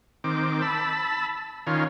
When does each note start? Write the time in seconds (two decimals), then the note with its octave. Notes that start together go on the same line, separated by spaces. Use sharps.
0.24 D#3 C4 D6
0.62 A5 B5 E6
1.67 D#3 C#4 F4